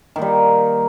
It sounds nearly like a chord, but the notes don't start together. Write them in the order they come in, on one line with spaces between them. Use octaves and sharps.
D#3 A#3 G3